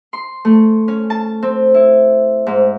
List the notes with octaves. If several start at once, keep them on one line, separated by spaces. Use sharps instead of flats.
C6
A3
C#4
A5
C4
E4
G#2